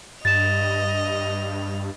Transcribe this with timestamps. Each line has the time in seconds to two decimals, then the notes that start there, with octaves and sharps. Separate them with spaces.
0.25 G2 D#5 A6 E7 F7